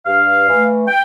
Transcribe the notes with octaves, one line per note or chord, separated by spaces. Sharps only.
G2 F5
E3 A3
G5